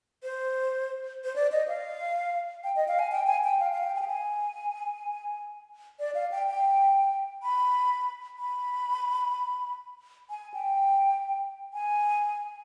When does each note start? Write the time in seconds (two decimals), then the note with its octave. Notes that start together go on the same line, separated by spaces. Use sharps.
0.23 C5
1.24 C5
1.36 D5
1.52 D#5
1.68 F5
2.64 G5
2.76 D#5
2.88 F5
2.99 G#5
3.12 G5
3.27 G#5
3.44 G5
3.60 F5
3.72 F5
3.83 G5
3.95 G#5
4.02 G5
4.07 G#5
6.00 D5
6.15 F5
6.32 G5
6.47 G5
7.43 B5
8.39 B5
10.30 G#5
10.54 G5
11.74 G#5